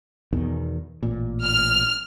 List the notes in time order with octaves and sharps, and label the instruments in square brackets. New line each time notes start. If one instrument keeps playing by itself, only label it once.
[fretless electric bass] E2 B2 D#3
A1 A#2
[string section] F6